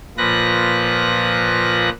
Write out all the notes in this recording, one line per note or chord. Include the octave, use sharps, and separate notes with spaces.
A#2 F3 B4 F#6 A#6